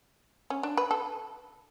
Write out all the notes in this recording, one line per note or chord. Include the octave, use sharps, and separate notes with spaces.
C#4
D4
B4
A4